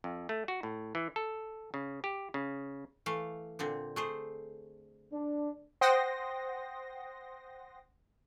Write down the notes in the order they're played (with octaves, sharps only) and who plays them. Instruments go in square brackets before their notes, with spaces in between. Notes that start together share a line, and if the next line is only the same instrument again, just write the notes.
[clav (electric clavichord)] F2
A3
F#4
A2
E3
A4
C#3
G4
C#3
[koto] E3 A3 F5
A#2 D3 C4
A3 G#4 C5
[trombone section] D4
[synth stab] C5 F#5 G5 C6 D#6 A#6